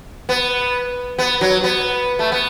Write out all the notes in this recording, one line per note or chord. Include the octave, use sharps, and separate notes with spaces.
B3
B3
F#3
B3
A3
B3